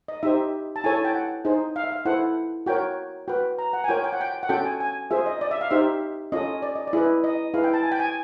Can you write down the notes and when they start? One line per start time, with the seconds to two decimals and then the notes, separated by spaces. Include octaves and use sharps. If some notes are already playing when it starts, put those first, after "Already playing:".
0.08 D#5
0.23 D#4 G4 C5 E5
0.76 A5
0.84 E4 A4 C#5 G#5
0.94 A5
1.05 G5
1.14 F#5
1.45 D#4 G#4 C5
1.76 F5
1.84 E5
1.92 F5
2.05 E4 A4 C5 F#5
2.66 F#4 A#4 C#5 G5
3.28 F#4 B4 G5
3.59 A#5
3.73 F#5
3.84 G#5
3.88 F4 A#4 C#5 G5
4.04 G5
4.13 F#5
4.21 G5
4.43 F#5
4.49 C#4 F#4 A4 G5
4.64 G#5
4.80 G#5
5.11 F4 G#4 C5 E5
5.26 D#5
5.41 D5
5.51 E5
5.61 F5
5.71 D#4 G4 C5 E5
6.32 C#4 F4 A4 D#5
6.62 D5
6.76 D#5
6.87 D5
6.93 E4 G#4 B4
7.24 D#5
7.54 E4 G#4 B4 F5
7.64 G5
7.74 A5
7.83 G#5
7.92 G5
8.00 G#5